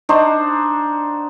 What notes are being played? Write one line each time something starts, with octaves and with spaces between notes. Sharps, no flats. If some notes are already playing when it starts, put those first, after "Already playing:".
D4 D#4 F#4 C5